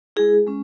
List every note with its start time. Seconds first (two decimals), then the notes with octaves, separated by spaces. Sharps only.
0.16 G#3 E4 G#4
0.47 G#3 C#4